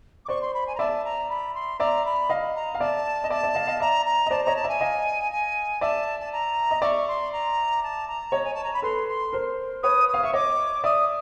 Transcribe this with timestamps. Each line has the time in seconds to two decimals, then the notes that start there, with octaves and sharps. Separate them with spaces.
0.25 D6
0.28 C5 D5 C#6
0.41 C6
0.53 B5
0.67 G#5
0.75 A#5
0.79 D5 E5 A5
1.04 A#5
1.29 B5
1.54 C6
1.79 D5 E5 A#5
2.05 B5
2.30 D#5 F5
2.55 A#5
2.75 F5
2.80 D5 E5 A5
3.24 D#5
3.30 D5 E5 A5
3.43 D5 E5
3.55 D#5 F5
3.67 D#5 F5
3.80 D5 E5 A#5
4.05 A#5
4.26 D#5
4.30 C5 D5 A5
4.43 C#5 D#5 A#5
4.56 A5
4.64 D5 E5 G#5
4.81 D#5 F5
5.31 G#5
5.81 D5 E5 A5
6.19 A5
6.32 A#5
6.71 D#5
6.82 D5 E5 C#6
7.07 C6
7.32 A#5
7.82 A5
8.07 A#5
8.32 C#5 D#5
8.44 G#5
8.54 A5
8.63 A#5
8.73 B5
8.82 A4 B4 C6
9.08 C6
9.33 A#4 C5
9.83 B4 C#5 D#6
10.08 D#6
10.14 F5
10.23 E5 C#6
10.33 C#5 D#5 D6
10.84 D5 E5 D#6